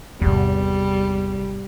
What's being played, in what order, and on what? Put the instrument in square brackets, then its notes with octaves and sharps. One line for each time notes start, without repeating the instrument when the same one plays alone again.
[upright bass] G#1 C3 [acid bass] E2 [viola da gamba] G3